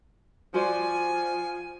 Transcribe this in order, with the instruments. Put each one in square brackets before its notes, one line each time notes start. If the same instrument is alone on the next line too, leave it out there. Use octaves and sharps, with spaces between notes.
[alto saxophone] F3 [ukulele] F#4 C5 D5 [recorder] G#5